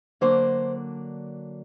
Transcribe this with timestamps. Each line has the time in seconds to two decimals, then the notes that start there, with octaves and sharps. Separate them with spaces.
0.21 D3 F#3 A#3 D4 C5